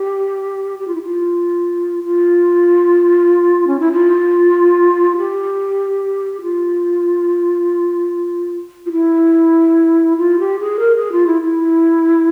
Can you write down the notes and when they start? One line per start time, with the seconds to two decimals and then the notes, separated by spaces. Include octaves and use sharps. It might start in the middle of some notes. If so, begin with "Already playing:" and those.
Already playing: G4
0.79 G4
0.88 F4
0.95 E4
1.03 F4
2.04 F4
3.67 C#4
3.80 E4
3.93 F4
5.17 G4
6.42 F4
8.86 F4
8.92 E4
10.18 F4
10.39 G4
10.60 G#4
10.80 A#4
10.96 G#4
11.12 F4
11.27 E4
11.42 E4